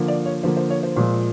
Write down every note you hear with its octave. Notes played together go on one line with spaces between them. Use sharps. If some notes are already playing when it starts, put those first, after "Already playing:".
Already playing: D3 F3 A#3
D5
C#5
D3 F3 A#3 C5
C5
C#5
C5
A#2 F3 G#3